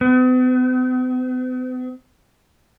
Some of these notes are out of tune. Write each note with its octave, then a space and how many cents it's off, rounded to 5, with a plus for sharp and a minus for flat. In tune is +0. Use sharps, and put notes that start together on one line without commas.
B3 +45